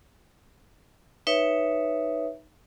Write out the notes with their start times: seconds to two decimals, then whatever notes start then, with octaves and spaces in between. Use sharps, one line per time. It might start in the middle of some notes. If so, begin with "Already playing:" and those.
1.27 D#4 B4 C#5 E5